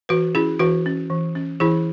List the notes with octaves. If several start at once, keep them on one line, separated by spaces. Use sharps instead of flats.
E3 F#4 B4
C#4 E4 G#4
E3 F#4 B4
C#4
E3
C#4
E3 E4 G#4